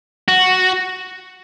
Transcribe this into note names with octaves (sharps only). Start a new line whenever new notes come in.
F#4